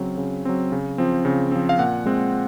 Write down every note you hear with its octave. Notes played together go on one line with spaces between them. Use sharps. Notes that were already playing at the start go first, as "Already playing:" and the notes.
Already playing: C#3 F#3 C4
C#3
F#3 C4
C#3
F3 C4
C#3
F3 C4
F5
A#2 F#5
G#3 C4